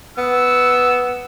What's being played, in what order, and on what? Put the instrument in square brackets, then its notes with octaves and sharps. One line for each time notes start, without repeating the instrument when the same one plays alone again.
[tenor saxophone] B3 [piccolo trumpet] E6